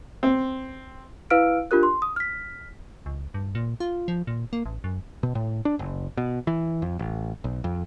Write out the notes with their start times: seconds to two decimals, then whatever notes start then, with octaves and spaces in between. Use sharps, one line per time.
0.23 C4
1.30 E4 B4 F5 E6 F6 D7
1.71 D4 F4 G4 A#4 F#6
1.83 C6
2.02 D#6
2.16 F6 B6
3.06 C#2
3.34 G2
3.55 A#2
3.80 F4
4.08 F3
4.27 A#2
4.53 A#3
4.66 A1
4.84 F#2
5.23 B2
5.35 A2
5.65 D4
5.79 F#1
6.17 B2
6.47 E3
6.82 F2
6.99 A1
7.44 B1
7.64 F2